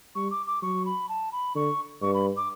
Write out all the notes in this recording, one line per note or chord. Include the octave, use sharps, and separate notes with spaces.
G3 C#6
D6
D6
F#3 C#6
B5
A5
B5
D3 C#6
G2 C#6
B5
D6